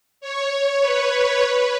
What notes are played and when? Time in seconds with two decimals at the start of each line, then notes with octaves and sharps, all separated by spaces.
0.21 C#5
0.81 B4
1.12 B4
1.42 B4